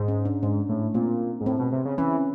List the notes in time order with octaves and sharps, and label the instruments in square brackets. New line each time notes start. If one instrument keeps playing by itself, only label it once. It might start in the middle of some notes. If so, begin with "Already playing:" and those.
Already playing: [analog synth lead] G#2
[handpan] C#4
D4
[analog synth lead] G#2 [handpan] D4
[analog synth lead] A2
[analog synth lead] A#2 [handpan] C4
[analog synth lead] G#2
[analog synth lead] A2 [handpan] C4
[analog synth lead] B2
C3
C#3
[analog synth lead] E3 [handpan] C#4